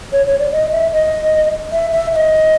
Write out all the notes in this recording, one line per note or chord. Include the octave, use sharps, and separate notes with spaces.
C#5
C#5
D5
D#5
E5
D#5
E5
E5
E5
D#5